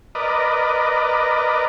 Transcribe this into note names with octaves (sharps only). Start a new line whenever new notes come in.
A#4 B4 D5 D#5